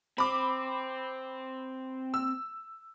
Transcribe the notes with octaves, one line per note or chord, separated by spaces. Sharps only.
C4 B5 D6
E6